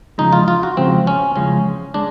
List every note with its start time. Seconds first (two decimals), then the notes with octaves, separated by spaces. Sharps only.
0.18 E2 C#3 F3 G#3 D#4
0.33 F4
0.48 F4
0.63 F#4
0.77 E2 C#3 F3 G#3 C4
1.07 C#4
1.36 E2 C#3 F3 G#3 C#4
1.94 G#3 D4